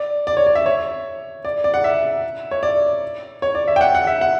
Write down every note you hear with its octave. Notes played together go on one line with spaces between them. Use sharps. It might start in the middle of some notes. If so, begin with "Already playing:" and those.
Already playing: D5
D5
C#5
D5
E5
C#5
D5
D5
F#5
E5
C#5
D5
C#5
D5
E5
G5
F#5
F#5
E5
F#5